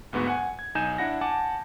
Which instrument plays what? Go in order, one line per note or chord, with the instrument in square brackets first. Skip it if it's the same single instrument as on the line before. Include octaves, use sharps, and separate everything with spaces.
[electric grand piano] D2 G#2 B3 F#4 C#6
F#5 G#5
G#6
B1 D#4 G#5 G6 E7
D4 E4 F#5 A#6
F#5 G#5 A5 D6